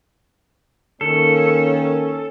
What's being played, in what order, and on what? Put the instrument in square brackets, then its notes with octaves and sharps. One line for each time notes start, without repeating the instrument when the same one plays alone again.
[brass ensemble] D#3 A#3 C#4 [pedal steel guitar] A4